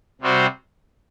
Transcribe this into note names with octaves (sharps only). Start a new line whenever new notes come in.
C3 G3 C4 F#4 C5